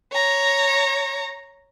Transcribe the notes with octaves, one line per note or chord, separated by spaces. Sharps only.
C#5 A#5